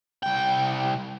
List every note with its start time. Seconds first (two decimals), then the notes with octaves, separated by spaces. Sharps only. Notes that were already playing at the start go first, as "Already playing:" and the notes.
0.23 C2 G5